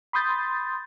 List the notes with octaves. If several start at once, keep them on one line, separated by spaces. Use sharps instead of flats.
B5 C6 D#6 G6 A6